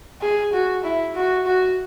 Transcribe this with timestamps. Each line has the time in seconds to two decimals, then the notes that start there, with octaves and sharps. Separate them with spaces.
0.22 G#4
0.53 F#4
0.84 E4
1.15 F#4
1.46 F#4